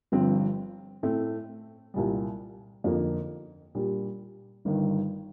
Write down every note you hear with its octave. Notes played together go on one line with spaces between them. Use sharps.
G1 G2 F3 C4
A2 A3 C4
C2 A#2 G3
F2 D3 F3 A#3 D#4
A#2 G3 D4 G4
G1 G2 D#3